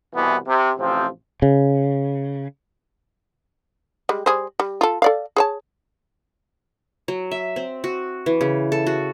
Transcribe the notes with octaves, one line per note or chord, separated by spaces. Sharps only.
C2 B2 E3 B3
C3
A1 C3 F3 C4
C#3
G3 G#3
G3 G#4 C5
G3
F4 A4
A4 D5 F5
G#4 C#5 A5
F#3
E5
C4
F#4
E3
C#3
A4
F#4